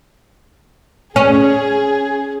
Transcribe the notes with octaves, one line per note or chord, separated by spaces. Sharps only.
C#4 G#4